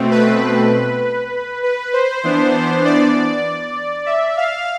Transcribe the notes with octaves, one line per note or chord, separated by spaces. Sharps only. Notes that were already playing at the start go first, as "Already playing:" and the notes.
Already playing: B2 A3 C4
B4
B4
C5
E3 B3 D4
D5
E5
F5